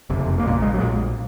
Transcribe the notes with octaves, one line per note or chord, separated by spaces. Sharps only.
F#1 F2 C3
A#3
A#1 A#2 G#3
G#3
F#3
A#1 A#2 G#3